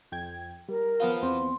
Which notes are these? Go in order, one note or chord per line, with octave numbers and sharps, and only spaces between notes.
F2 G5 G#6
G3 A#4
F3 B3 F4 F5
E2 C4 C6